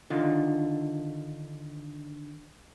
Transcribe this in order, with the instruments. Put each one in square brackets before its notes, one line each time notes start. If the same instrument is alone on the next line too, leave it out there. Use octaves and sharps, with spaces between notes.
[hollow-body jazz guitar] D3 D#3 F4